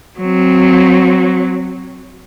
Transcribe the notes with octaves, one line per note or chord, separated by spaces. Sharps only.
F#3 C4